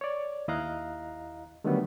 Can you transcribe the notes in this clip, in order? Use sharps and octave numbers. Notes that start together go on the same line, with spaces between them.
C#5 D5
D#2 E4 D#5 F5 A#5 F#6
D3 D#3 F#3 G3 A3 B3